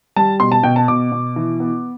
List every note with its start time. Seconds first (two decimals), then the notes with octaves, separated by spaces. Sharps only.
0.16 G3 A5
0.40 B2 C6
0.52 A5
0.63 B2 G5
0.76 A5
0.88 B2 D6
1.12 B2
1.36 E3
1.60 B3